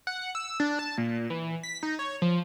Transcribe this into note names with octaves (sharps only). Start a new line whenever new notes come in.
F#5
E6
D4
A5
A#2
E3
B6
D#4
C#5
F3